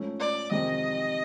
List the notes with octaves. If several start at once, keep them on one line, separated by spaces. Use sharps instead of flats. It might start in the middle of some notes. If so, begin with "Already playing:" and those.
Already playing: G#2 F3 A3 C#4
D5
F2 C3 D#3 G#3 C4 D#5